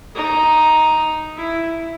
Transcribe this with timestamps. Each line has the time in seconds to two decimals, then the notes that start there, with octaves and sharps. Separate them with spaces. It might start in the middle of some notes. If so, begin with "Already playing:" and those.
0.16 D#4
1.36 E4